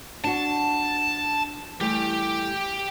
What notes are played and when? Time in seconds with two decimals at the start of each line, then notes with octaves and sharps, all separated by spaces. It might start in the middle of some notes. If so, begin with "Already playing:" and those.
0.24 D4 F#4 A5
1.80 E3 G3 A3 G4